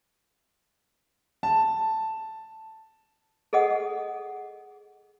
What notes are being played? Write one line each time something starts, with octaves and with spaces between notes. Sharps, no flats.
A5
G#4 A4 D#5 F#5 D#6